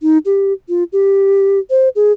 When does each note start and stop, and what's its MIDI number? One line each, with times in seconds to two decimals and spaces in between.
0.02 0.18 63
0.25 0.53 67
0.69 0.84 65
0.93 1.59 67
1.70 1.89 72
1.96 2.12 68